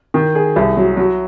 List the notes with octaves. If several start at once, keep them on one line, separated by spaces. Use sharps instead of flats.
D#3
G#4
C2
F#3
F#3